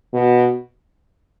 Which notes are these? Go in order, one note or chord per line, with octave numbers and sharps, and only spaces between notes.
B2